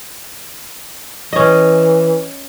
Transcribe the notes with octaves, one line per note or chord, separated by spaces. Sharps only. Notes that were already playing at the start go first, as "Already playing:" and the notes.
E3 C#4 D#5